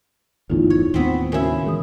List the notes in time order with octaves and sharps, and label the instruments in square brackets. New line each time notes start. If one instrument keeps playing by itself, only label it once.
[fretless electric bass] G1 E2 A2 [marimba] D#4 F4
[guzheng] C#5
[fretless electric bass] D#2 A2 D#3 [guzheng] B3 C4
[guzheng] C#3 E4 [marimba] F#4 A#4 G#5
[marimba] D#3 E3 D#6 [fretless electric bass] G#3